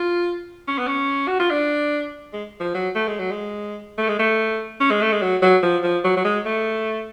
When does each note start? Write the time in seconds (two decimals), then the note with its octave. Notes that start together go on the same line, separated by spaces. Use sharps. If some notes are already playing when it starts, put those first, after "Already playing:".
Already playing: F4
0.68 C#4
0.78 B3
0.87 C#4
1.28 F#4
1.39 F4
1.50 D4
2.33 G#3
2.61 F3
2.74 F#3
2.95 A3
3.07 G#3
3.19 F#3
3.31 G#3
3.98 A3
4.09 G#3
4.19 A3
4.80 C#4
4.91 G#3
5.01 A3
5.12 G#3
5.22 F#3
5.42 F#3
5.63 F3
5.84 F3
6.04 F#3
6.17 F#3
6.25 G#3
6.46 A3